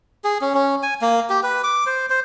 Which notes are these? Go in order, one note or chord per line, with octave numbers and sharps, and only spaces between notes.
G#4
C#4
C#4
G#5
A#3
G4
B4
D6
C5
C5